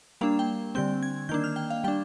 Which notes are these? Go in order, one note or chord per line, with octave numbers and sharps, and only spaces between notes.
G3 A#3 D4 F5
G5
D3 G3 C4 G6
G#6
D#3 A#3 D4 G6
F6
G5
F5
G3 D4 G5